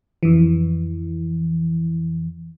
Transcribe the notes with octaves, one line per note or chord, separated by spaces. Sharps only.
F2 E3